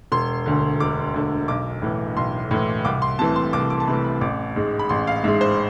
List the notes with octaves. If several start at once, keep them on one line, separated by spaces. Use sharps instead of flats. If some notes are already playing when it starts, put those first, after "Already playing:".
E1 C6
D2 D3
E1 D6
D2 D3
B1 D6
A2 E3
B1 C6
A2 E3
C2 D6
C6
C3 E3 A3 A5
C6
C2 D6
D6
A5
C3 E3 A3 B5
B5
A1 D6
G#2 G#3
B5
A1 C6
F5
G#2 G#3 E5
C5